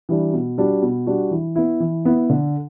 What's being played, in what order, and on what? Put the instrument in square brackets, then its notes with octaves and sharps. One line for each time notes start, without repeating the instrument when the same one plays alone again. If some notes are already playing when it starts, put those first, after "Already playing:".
[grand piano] E3 G3 D4
B2
G3 D4 F#4
B2
G3 D4 F#4
E3
B3 E4
E3
B3 E4
D3